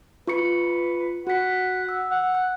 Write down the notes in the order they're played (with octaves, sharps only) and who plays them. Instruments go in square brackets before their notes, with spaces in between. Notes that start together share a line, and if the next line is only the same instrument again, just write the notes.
[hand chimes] F4 C#6 C#7 [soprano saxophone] B4
[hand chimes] F#4 B6 [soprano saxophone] F#5
[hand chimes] E6
[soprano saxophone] F#5
[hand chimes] F#6